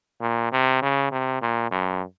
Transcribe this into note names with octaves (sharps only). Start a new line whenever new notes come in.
A#2
C3
C#3
C3
A#2
F#2